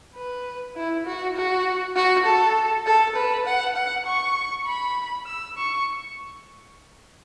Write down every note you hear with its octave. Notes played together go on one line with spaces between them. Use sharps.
B4
E4
F#4
F#4
F#4
A4
A4
B4
F#5
F#5
C#6
B5
E6
C#6